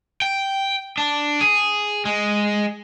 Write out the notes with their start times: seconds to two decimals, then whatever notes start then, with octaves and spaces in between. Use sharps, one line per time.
0.22 G5
0.98 D4
1.41 G#4
2.05 G#3